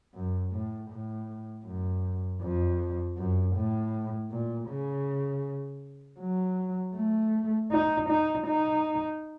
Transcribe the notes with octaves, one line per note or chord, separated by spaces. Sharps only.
F#2
A2
A2
F#2
F2
F#2
A2
A#2
C#3
F#3
A3
D#4
D#4
D#4